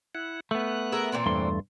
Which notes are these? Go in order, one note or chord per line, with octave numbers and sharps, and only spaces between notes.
E4 F#5
A3 B3 F#6
G#4 A#4 E5
A#2 E3 C4
E2 G2 A3 C6